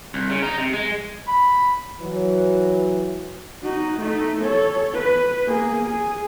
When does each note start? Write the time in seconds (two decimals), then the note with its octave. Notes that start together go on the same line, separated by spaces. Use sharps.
0.14 C2
0.30 C#3
0.43 D#4
0.58 C3
0.73 G#3
1.28 B5
2.02 E3 F#3
3.62 D#4 F#4
4.00 A3 D#4
4.42 A4 C#5
4.93 B4
5.47 A#3 G#4
5.87 G#4